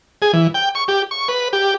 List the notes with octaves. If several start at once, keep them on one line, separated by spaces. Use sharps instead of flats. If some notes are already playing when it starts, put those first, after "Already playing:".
G#4
E3
G5
C#6
G4
C#6
B4
G4